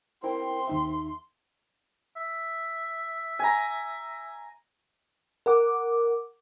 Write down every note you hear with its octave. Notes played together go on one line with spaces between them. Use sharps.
C4 E4 A#4 G5 C6
D#2 D#4 E5
E5
G#5 A#5
A#4 F#5 D6